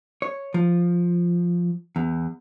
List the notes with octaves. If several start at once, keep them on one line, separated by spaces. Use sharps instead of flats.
C#5
F3
E2